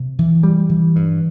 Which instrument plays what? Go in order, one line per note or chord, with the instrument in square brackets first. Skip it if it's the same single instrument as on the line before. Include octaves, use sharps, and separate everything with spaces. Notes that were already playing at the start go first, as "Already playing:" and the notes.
Already playing: [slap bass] C3
E3
G3
E3
G2